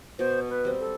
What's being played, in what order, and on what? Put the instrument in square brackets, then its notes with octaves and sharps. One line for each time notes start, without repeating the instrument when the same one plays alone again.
[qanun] B2 [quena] C5
[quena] B4
[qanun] G3 C4
[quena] A4